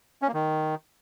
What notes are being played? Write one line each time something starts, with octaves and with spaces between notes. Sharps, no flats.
C#4
A#3
D#3